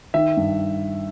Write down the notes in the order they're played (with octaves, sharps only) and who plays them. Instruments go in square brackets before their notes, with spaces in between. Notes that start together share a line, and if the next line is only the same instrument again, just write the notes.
[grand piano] D#3 E5
G2